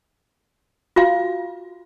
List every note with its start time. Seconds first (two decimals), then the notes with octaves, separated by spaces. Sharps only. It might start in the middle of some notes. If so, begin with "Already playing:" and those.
0.96 F4 F#4 F5